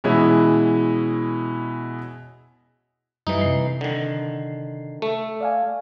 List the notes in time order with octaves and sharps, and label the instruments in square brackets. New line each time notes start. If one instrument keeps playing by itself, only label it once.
[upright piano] B2 E3 G#3 C#4 E4
[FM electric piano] F#2 G3 [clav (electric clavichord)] E3 D#4
[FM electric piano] C3 C7
[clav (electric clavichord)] D3 D#3
[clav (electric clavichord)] A3 [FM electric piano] A4
[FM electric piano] D5 F5 G#5